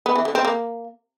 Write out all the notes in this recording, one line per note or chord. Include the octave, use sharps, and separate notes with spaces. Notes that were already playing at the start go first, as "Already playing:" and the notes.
B3
E3
D3
C4
A#3